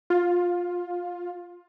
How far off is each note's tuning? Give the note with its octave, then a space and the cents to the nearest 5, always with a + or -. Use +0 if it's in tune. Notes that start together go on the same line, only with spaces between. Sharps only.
F4 +15